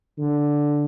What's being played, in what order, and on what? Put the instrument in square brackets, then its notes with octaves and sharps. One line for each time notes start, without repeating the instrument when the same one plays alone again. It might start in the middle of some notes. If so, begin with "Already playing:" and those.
[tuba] D3